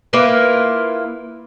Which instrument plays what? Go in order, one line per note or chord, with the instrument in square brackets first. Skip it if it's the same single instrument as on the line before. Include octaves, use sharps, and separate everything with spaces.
[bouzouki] A#3 E4 F4 B4